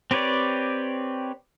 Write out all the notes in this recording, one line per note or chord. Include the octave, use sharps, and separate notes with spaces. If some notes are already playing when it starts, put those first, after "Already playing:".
C4 G4 B4 C#5 D5